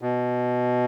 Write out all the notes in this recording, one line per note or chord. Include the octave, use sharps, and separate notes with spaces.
B2